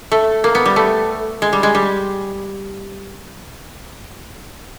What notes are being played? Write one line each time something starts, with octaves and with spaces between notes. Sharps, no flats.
A3
A#3
B3
G3
A3
G#3
G3
G#3
G3